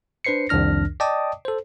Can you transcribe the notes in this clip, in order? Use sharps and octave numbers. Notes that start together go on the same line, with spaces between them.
D4 B4 C5 C7 C#7
C2 F2 D#3 D4 F6 A#6
D5 D#5 G5 A5 D6 D#6
A4 C5